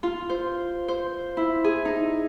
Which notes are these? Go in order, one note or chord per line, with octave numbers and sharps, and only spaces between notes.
F4
C5
C5
E4
G#4
D#4